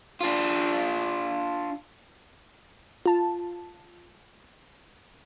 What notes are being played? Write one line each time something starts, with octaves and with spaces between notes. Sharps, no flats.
D4 F4
F4 A5